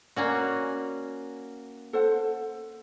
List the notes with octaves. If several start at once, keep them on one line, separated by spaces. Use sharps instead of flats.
A#3 C#4 F#4 D5
A4 C5 F#5